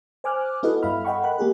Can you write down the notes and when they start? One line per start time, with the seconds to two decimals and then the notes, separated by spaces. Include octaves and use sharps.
0.24 C5 G#5 D6 F6 F#6
0.63 B3 E4 F#4 A4 B4 D#5
0.82 G2 E5 F5 B5 F6
1.05 A4 D#5 F#5 G5 B5 C#6
1.23 A#4 B5 F#6
1.38 A#3 G4 G#4 A#4